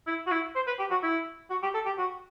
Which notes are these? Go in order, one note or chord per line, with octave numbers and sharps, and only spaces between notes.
E4
F#4
E4
C5
B4
G4
F#4
E4
F#4
G4
A4
G4
F#4